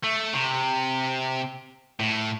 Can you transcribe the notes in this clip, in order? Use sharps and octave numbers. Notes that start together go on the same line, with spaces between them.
A3
C3
A2